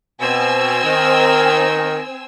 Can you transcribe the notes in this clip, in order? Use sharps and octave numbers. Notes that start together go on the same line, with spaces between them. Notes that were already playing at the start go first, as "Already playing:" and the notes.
B2 C4 G#5 E6
D#3